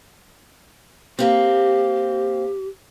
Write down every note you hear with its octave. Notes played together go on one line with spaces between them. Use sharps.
A#3 C4 G4